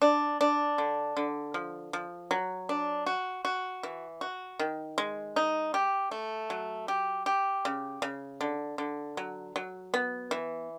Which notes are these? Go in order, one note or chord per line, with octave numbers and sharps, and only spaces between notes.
D4
D4
D3
D3
F3
F3
F#3
D4
F#4
F#4
E3
F#4
D#3
G#3
D#4
G4
A3
F#3
G4
G4
C#3
C#3
D3
D3
F#3
F#3
B3
E3